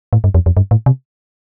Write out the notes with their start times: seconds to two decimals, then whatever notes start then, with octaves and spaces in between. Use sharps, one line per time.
0.13 A2
0.24 G2
0.34 F2
0.46 F2
0.57 G2
0.71 A2
0.86 C3